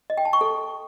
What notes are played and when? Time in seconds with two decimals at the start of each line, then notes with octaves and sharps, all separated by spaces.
0.10 D#5
0.17 G5
0.25 A5
0.33 C#6
0.41 A4